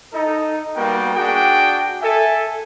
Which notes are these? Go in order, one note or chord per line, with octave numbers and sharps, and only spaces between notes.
D#4 A4
G3 A#3 B3 F#4 A#4 G5
D4 F#4 G#4 G5
A4 E5 G#5